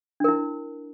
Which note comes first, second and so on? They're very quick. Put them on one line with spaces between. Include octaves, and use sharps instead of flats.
D4 A#4 E4